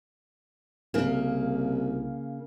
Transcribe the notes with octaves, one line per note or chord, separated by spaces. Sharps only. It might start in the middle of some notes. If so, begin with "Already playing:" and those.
C2 C#3 A#3